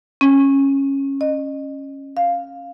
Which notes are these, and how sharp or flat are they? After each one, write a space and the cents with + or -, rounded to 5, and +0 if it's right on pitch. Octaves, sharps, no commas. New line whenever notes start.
C#4 -15
D#5 -25
F5 +0